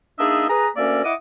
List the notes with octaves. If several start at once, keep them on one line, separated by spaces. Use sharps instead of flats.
A#3 D4 D#4 G#4 D#5 E5
G#4 B4 A#5
D2 A#3 C#4 A#4 D5 E5
E4 D#5 F#5 D6 D#6